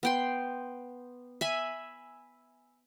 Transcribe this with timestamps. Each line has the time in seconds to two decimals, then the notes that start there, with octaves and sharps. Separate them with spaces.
0.03 B3 G5 C6
1.41 E5 G#5 B5